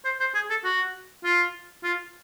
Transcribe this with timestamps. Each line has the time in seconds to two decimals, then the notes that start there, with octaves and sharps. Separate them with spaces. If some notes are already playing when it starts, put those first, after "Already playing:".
0.05 C5
0.20 C5
0.35 G#4
0.50 A4
0.64 F#4
1.24 F4
1.83 F4